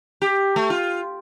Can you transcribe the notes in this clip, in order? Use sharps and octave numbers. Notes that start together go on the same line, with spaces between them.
G4
A3
F4